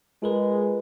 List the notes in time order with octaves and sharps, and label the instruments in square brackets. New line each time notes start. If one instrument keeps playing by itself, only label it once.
[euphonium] G#3 [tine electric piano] F4 A#4 B4